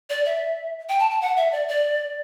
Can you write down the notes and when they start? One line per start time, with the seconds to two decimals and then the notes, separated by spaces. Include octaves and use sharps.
0.10 D5
0.25 E5
0.89 G5
0.99 A5
1.11 A5
1.21 F#5
1.37 E5
1.52 D5
1.68 D5